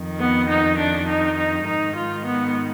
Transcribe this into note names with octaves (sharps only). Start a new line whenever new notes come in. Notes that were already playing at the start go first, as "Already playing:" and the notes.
Already playing: F2 D#3
B3
D#4
D4
D#4
D#4
G#2 D#3 D#4
F4
B3